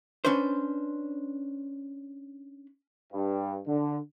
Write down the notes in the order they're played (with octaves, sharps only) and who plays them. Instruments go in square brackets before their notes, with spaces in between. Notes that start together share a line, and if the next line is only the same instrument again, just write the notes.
[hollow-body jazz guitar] C#4 D4 B4 C5
[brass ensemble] G2
D3